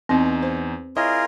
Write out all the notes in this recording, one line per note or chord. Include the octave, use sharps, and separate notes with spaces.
E2 C4 D#4 C6
C5
E4 F4 G#4 A#4 C#5 D#5